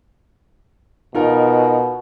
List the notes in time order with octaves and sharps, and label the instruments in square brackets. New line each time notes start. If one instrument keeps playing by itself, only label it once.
[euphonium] B2 [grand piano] D#4 F4 A#4